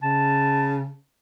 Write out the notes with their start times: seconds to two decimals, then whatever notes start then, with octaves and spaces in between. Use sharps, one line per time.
0.03 C#3 A5